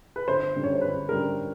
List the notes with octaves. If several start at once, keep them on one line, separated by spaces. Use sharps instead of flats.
B4
G1 C5
F#2 D3 G3
C#5
C5
G1 B4
F#2 D3 G3 A#4